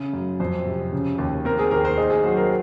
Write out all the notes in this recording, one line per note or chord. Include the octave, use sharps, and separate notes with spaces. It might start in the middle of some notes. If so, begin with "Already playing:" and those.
Already playing: C#3
F#2
F2 C5
C3
C#3
D#2
C4 A#4
G#4
D#2 A#4
C5
D#4 G#4
G#4
F#3 C5
A#4